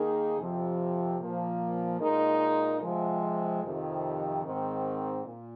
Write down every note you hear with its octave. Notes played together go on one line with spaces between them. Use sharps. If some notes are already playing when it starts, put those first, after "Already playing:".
Already playing: D#3 A#3 D#4 G#4
F2 C3 F3
A#2 F3 A#3
A#2 G#3 D#4 A#4
C3 F3 G#3
F2 C3 D#3
G#2 D#3 C4
A#2